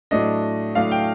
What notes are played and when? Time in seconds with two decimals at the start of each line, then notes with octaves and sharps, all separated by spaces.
0.11 A2 F#3 A3 D4 D#5
0.75 A2 F#3 A3 D4 F5
0.91 G5